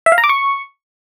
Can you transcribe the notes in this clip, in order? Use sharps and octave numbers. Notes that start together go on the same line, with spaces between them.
E5
F5
A#5
D6
C#6